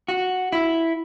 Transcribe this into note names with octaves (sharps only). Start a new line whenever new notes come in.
F#4
E4